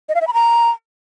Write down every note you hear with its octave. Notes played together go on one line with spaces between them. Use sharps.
D#5
F5
E5
B5
A#5